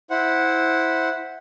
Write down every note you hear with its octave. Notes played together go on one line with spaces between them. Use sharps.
E4 C5 F#5